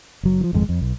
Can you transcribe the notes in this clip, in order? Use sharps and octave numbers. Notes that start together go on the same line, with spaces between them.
F#1 F#3
D#3 F3
G#1 F2 G#3
F2
B1